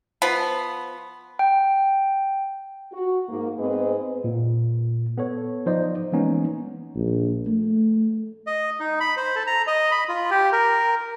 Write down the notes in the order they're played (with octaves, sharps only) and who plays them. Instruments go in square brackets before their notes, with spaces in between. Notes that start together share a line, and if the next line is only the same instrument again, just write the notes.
[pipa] F3 B3
[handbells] G5
[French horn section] F#4
G#2 A#3
G#2 B3 C4 G#4 B4 D#5
[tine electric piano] A#2
B3 A4 C#5
F3 D#4 C5 D5 D#5
E3 G#3 A#3 B3 C#4 D#4
[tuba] A#1
A3
[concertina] D#5
D#4
B5
C5
A4
A#5
D#5
B5
F4
G4
A#4